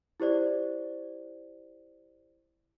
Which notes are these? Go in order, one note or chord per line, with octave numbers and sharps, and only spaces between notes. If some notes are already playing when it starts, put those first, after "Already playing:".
E4 G4 C5 D5